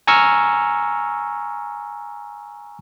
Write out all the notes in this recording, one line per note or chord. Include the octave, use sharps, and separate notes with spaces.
G#5 A#5 C#6 E6 F6